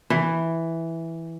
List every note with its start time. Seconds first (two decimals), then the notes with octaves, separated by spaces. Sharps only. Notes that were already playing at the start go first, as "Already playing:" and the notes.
0.10 E3